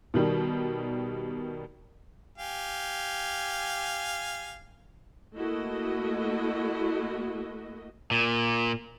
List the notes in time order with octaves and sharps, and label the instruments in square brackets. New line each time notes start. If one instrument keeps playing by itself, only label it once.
[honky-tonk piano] B2 D#3 G3
[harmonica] G4 F5 G#5
[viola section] A3 A#3 E4 F#4 D#5
[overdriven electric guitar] A#2